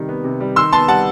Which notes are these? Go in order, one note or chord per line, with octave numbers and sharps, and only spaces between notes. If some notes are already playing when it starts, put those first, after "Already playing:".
Already playing: C3 D#3 G3
B3
C3
G3
D#3 C6 E6
B3 A5 C6
G3 F#5 A5